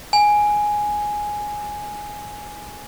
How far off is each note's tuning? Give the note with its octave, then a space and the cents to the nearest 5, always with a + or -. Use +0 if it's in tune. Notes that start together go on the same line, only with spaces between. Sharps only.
G#5 +5